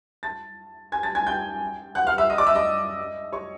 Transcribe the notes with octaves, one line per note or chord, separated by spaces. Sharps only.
A5 A6
G#5 G#6
A5 A6
G#5 G#6
G5 G6
F#5 F#6
F5 F6
E5 E6
D#5 D#6
D5 D6
E5 E6
D#5 D#6
C#5 C#6